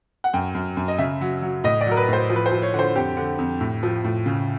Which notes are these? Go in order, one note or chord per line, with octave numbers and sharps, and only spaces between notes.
F#5
F#2 G5
F#2
F#2
D#5
C#3 E5
F#3
F#3
A2 D#5
D5
F#3 A#4
B4
A2 C5
F3
B4
C5
F3
C#5
D3
C5
F2 G4
D3
F2
A2
F3
A2
C#3